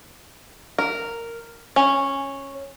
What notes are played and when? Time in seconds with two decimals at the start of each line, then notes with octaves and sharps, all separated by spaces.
0.79 A#4
1.76 C#4